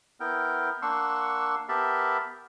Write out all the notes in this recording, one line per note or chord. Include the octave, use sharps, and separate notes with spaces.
B3 E4 A#4 G5
A#3 D4 F#5 C6 C#6 E6
B3 G4 A#4 E5 A5 B5